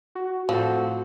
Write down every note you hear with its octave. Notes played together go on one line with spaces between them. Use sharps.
F#4
A2 F3 C4 F#4 A4